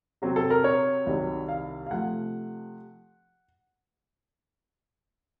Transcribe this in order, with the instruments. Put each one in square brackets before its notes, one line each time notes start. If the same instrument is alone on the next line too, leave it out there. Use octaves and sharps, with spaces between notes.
[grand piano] C3 F#3 C4
A4
A#4
C#5
C2 C3 D#3 F#3
F5
F5
C3 F3 A3 F#5